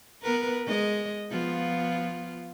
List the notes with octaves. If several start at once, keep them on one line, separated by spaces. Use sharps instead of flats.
B3 A#4 B4
G#3 D#5
F3 B3 F4